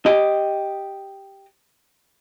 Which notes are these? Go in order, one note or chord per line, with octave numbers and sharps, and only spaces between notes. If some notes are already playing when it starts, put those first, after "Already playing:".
G4 D#5